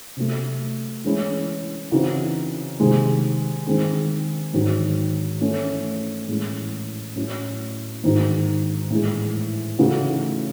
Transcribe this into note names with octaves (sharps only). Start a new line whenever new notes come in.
C3 F#3 A3
E3 G#3 C#4 E4
C#3 E3 C4 D#4 F#4
C3 D#3 G#3 D#4
D#3 G#3 C4
G#2 D#3 F#3
E3 A3 C#4
A2 E3 G#3 C#4
A2 F#3 C#4 E4
G#2 D#3 G#3 D#4 F#4
A2 E3 G#3
C#3 E3 A3 D#4 F#4